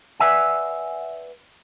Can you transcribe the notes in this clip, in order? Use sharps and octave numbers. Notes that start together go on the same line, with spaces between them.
B4 D5 E5 F#5 G#5